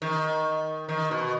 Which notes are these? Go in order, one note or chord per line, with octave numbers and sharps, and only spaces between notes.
D#3
D#3
B2